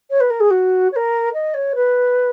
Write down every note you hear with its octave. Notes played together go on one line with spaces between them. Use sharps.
C#5
B4
A#4
G#4
F#4
C#5
A#4
D#5
C#5
B4